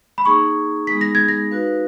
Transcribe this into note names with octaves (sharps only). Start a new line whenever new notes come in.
B5
A#3 D#4 G#4 C#6
G#3 B3 D#4 G#4 B6
A#6
G#6
A#6
D#4 F#4 B4 F5